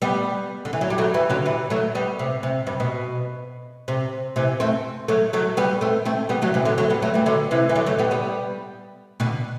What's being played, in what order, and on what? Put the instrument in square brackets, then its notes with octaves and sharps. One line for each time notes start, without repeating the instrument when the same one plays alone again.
[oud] G3 B3
D3
E3
F#3
G3
F#3 A3
E3 G3
D3 F#3
E3 G3
F#3 A3
G3 B3
C3
C3
G2
B2
C3
C3 E3
A3 C4
F#3 A3
F#3 A3
G3 B3
A3 C4
A3 C4
G3 B3
F#3 A3
C3 E3
D3 F#3
F#3 A3
G3 B3
F#3 A3
E3 G3
D3 F#3
C3 E3
E3
D3 F#3
F#3 A3
G3 B3
G3 B3
B2 D3